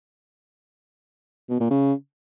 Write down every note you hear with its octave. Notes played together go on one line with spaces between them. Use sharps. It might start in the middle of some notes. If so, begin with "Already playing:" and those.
B2
A#2
C#3